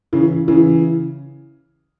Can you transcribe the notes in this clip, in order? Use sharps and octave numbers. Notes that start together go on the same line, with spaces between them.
C#3 E3
C#3 E3